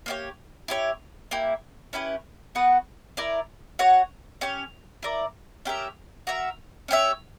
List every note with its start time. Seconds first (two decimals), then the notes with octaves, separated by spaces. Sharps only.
0.06 A#3 E4 G4 C#5
0.68 E4 G4 C#5
1.31 A#3 E4 G4
1.93 C#4 E4 G4 B4
2.55 B3 F#4 B4 F#5
3.17 E4 A#4 D5
3.79 F#4 C#5 F#5
4.41 C#4 G4 C#5
5.03 E4 A#4 D5
5.65 C#4 G4 A#4 E5
6.27 F#4 A#4 E5
6.88 C#4 G4 C#5 E5